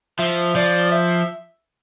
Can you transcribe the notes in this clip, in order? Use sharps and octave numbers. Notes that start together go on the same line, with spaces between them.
F3 E5
F3 D5
E5